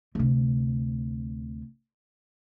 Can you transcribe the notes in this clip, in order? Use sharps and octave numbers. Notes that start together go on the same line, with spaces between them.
D2 C3